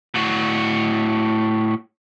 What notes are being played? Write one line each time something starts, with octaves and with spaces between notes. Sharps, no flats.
A2 F#4